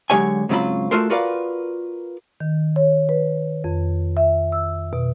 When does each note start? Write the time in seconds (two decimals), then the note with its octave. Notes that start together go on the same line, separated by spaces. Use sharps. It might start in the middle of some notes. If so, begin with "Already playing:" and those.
0.10 D3 F#3 G#3 G4 C#5 G#5
0.49 G#2 C#3 F#3 C4 F4 B5
0.91 A3 F4 F#4 A4 A#4 C5
1.10 F4 F#4 A#4 B4 D5 F5
2.40 D#3
2.76 C#5
3.09 B4
3.64 F2
4.17 E5
4.52 E6
4.93 B2